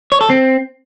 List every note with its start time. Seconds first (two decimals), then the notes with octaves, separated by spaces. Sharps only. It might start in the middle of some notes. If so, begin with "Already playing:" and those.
0.12 C#5
0.21 A4
0.30 C4